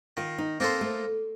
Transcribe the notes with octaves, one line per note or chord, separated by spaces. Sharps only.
D#3 F4
D#4
A#3 C4 D#4 A4 C5
A3